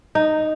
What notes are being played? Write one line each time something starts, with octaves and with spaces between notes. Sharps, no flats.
D#4